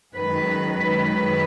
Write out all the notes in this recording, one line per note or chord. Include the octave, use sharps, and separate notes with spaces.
F#2 D#3 G#3 B4
B4